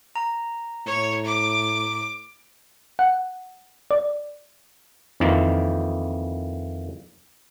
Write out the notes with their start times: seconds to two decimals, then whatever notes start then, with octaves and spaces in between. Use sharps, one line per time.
0.16 A#5
0.86 A2 C#5
1.25 D6
2.99 F#5
3.91 D5
5.20 F2 D#3 E3 A#3